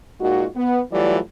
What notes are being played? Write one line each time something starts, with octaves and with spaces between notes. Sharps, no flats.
A#2 G#3 D#4 F4 F#4
B3
E3 F#3 G3 A3 F4 D5